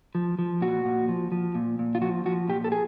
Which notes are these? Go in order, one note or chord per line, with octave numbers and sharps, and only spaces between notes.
F3
F3
A#2 F#4
A#2
F3
F3
A#2
A#2
F4
F3 F#4
F3 F#4
A#2 G4
A4
G#4